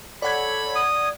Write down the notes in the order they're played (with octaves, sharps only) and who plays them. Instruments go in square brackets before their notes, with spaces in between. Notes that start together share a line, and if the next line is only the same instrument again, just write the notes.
[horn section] A4 C#5 B5 [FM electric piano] D5 F#5 G#6
[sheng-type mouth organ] D#6